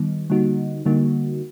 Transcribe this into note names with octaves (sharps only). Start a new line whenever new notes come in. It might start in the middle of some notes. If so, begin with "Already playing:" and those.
Already playing: D#3 G3 B3 D#4
D3 G3 A#3 D#4 F#4
D3 G3 A#3 D#4 F#4